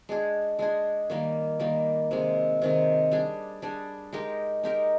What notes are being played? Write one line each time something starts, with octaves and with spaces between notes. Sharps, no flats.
G#3 D4 G#4
G#3 D4 G#4
D#3 G3 A#3
D#3 G3 A#3
C3 D#3 G#3
C3 D#3 G#3
G3 D4 G#4
G3 D4 G#4
G#3 D#4 G4 A#4
G#3 D#4 G4 A#4